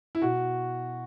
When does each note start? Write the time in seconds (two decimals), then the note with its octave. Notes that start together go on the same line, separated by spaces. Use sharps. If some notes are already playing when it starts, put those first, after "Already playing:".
0.15 E4
0.22 B2 F#4